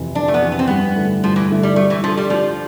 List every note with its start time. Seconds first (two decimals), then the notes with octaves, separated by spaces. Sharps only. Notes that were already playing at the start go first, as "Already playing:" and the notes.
Already playing: F2 C3 E3
0.15 F2 D4
0.28 A3
0.34 B3
0.42 C3 E3
0.52 B3
0.59 C4
0.67 G2 B3
0.96 D3 A3 E4
1.24 G2 F3
1.36 E3
1.49 D3 A3 E4
1.63 G3
1.76 G3 A3
1.90 E3
2.04 F3 D4 A4
2.17 G3
2.30 F3 G3